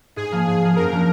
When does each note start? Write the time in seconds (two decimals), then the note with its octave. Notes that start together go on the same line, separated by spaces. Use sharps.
0.16 G#2 G#4
0.32 F3 A#3
0.47 G#2 G#4
0.62 F3 A#3
0.76 F#2 A#4
0.92 F3 A#3 D4